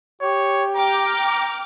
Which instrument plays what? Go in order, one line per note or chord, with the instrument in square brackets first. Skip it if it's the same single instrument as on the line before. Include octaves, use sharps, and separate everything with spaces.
[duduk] G4 [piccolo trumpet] C#5
[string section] G5 D6 F6 [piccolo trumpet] A#5